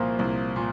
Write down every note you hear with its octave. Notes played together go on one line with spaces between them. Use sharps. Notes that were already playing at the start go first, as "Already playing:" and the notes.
Already playing: C2 A#2 F3 A#3 F5
C2
A#2